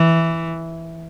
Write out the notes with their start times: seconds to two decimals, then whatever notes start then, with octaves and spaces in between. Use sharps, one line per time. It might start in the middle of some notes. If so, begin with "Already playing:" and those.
Already playing: E3